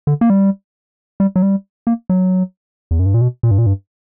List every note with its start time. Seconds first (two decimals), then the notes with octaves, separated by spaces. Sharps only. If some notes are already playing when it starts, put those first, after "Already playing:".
0.07 D3
0.21 A#3
0.30 G3
1.20 G3
1.36 F#3
1.42 G3
1.87 A#3
2.09 F#3
2.91 E2
2.99 F#2
3.06 G2
3.14 A#2
3.21 B2
3.43 A#2
3.51 G2
3.58 A#2
3.66 G2